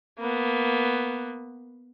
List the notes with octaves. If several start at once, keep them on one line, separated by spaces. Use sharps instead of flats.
A#3 B3